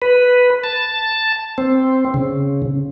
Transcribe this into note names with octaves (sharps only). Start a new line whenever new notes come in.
B4
A5
C4
C#3